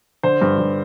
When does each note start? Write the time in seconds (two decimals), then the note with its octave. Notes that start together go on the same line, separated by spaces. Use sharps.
0.23 D3 C5
0.42 G2
0.58 G2